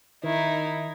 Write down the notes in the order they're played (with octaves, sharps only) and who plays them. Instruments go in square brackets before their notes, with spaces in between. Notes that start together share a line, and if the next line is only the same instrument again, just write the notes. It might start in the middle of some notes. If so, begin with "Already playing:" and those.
[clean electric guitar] D#3 [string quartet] D#4 E4